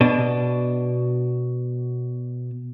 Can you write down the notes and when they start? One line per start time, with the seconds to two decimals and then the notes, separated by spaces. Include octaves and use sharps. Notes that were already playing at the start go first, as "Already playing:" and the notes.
0.01 B2 D4